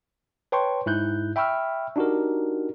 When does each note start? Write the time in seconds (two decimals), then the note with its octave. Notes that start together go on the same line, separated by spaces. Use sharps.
0.52 B4 C#5 G5 A5 C6 C#6
0.86 G#2 E4 F#6 G6
1.36 E5 G5 B5 C#6 E6 F6
1.96 D4 D#4 F#4 G4 A#4